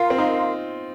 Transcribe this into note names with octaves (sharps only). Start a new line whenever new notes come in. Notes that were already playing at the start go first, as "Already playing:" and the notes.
Already playing: F4 A#4 F5 C6
C4
D#4